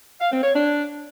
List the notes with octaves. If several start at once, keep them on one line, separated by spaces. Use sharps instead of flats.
F5
C4
C#5
D4